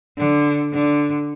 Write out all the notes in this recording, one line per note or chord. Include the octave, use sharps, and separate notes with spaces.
D3
D3